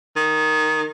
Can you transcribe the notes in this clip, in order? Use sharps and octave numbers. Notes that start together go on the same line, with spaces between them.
D#3